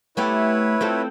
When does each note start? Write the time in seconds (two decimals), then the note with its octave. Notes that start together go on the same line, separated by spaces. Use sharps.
0.17 A3 B3 E4 G4 B4 C#5
0.81 C4 F4 A4